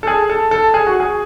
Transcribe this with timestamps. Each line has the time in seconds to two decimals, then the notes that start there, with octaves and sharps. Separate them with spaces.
0.03 A4
0.07 G#4
0.30 A4
0.51 A4
0.74 G#4
0.87 F#4
1.00 G#4